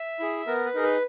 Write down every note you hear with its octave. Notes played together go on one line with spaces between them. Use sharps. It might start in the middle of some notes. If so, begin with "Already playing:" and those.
Already playing: E5
E4 G#4
B3 A#4
B4
D#4 G#4 A#4
B4